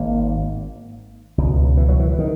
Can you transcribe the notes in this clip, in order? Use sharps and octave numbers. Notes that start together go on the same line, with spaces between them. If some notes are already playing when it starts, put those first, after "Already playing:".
Already playing: G#1 G#2 A#3
C#2 B2
E3
F#3
E3
D#3